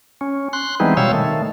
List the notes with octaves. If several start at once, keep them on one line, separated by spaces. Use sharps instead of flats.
C#4
C6 F#6
E3 G3 G#3 B3 C4 D#4
B2 G3 C#5 F5 E6
D#3 A3